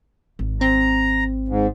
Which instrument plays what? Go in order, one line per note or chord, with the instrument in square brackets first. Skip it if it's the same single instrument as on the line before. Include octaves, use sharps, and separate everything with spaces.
[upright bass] G#1
[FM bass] C4 [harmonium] A#5
[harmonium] G#2